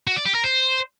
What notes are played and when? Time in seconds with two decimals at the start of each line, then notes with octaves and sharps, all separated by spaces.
0.07 F#4
0.16 D5
0.25 G4
0.35 A#4
0.44 C5